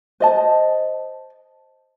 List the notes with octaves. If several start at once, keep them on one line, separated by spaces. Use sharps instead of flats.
C5 D#5 A5